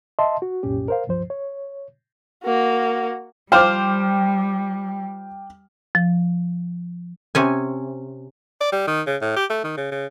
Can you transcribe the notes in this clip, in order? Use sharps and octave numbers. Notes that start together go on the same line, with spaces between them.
D#5 E5 A5 C6
F#4
C2 F#2 A#2 C#4 G4
A#4 C5 F5
C#2 G2 F3 C5
C#5
A#3 F#4
F3 G3 C5 F5 G5 D6 F6
F3
C3 C#4 G#5
D5
G3
D#3
C#3
A2
G4
A3
D#3
C#3
C#3